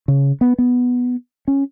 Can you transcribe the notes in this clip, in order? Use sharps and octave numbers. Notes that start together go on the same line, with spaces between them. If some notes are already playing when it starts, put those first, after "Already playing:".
C#3
B3
B3
C#4